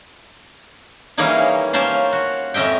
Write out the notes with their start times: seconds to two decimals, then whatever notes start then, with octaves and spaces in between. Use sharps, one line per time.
1.17 E3 G3 A#3 C#4 D#4 G#4
1.73 A#3 C#4 C5 A5 C6
2.13 F#4
2.54 F2 C#4 D#5 E5 G5